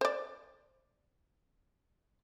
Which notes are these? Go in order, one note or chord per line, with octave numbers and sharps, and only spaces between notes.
C5 D5